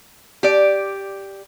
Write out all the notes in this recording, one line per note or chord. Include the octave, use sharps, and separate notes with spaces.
G4 D5